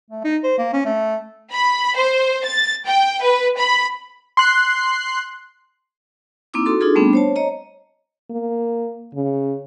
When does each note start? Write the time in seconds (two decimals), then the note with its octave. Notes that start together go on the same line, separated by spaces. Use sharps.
0.10 A3
0.24 D#4
0.44 C5
0.58 A#3
0.73 C#4
0.85 A3
1.52 B5
1.96 C5
2.44 A6
2.86 G5
3.22 B4
3.57 B5
4.37 C6 F#6 C7
6.54 A#3 C4 D#4 E4 D6 E6
6.66 F#4 A4 C6
6.81 D4 D#4 F4 G#4 A4
6.95 G3 A3 B3 C4 D4
7.13 C5 C#5 A5
7.36 C#5 D#5 A#5
8.30 A#3
9.14 C#3